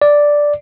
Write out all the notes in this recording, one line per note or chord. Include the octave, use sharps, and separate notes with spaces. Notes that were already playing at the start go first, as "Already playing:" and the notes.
D5